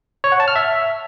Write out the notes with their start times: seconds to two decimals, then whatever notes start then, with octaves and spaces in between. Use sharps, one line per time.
0.24 C#5
0.32 F#5
0.40 A5
0.48 F6
0.56 E5